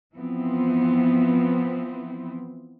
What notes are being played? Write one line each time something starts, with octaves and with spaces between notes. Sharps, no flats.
E3 F3 B3 C4